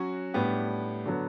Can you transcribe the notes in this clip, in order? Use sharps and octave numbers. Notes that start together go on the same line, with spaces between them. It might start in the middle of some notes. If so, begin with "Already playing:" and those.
Already playing: F#3 C#4 F#4
A2 G3 B3 D4 G4
D3 F#3 B3